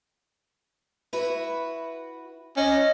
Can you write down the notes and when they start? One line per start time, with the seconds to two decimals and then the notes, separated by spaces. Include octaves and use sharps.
1.13 E4 F#4 B4
2.57 C#4 D#5